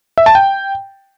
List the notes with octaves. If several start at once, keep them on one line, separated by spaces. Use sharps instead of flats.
E5
A5
G5